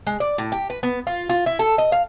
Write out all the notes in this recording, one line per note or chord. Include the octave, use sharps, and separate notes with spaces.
G#3
D5
A2
G4
B4
B3
F4
F4
E4
A4
D#5
F5